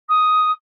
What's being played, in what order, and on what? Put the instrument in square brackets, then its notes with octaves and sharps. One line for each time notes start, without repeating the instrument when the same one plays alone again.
[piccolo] D#6